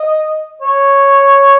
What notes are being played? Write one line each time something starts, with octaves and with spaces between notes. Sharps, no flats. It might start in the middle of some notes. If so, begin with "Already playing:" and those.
Already playing: D#5
C#5